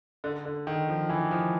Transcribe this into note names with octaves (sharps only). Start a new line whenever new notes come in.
D3
D3
D#3
F3
E3
F3